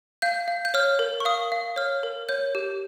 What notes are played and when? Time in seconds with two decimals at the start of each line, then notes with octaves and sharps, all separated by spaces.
0.22 F5 G6
0.48 F5
0.65 G6
0.74 C#5 F6
0.99 A#4
1.20 C#6
1.25 F5 D#6
1.52 F5
1.76 C#5 F6
2.03 A#4
2.29 C#5 G6
2.55 G4